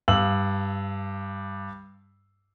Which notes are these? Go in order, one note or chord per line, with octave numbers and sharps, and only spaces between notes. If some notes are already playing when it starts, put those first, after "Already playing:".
G2 F5 E6 F#7